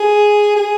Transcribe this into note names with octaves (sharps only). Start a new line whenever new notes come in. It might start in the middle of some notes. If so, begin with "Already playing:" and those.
Already playing: G#4
G#4